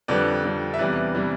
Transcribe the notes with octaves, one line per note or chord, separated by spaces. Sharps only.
F2 D3 G3 B4 D5
F2 D3 G3
E5
E2 C3 E3 G3 B4 D5
C3 E3 G3